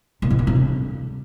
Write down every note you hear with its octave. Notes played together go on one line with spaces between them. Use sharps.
A#2
G#2
A#2
C#3
D3